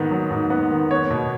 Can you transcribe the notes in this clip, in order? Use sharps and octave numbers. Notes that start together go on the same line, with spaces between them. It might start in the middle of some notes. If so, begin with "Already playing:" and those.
Already playing: G#2 D#3 B3
F#3
G#2
B3
D#3
B3 C#5
B2